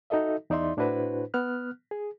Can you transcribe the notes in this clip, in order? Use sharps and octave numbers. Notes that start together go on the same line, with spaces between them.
D#4 F#4 A4 D#5 E5
E2 D#4 D5 E5 C6
A2 D4 E4 F#4 B4 C5
B3 F6 F#6
G#4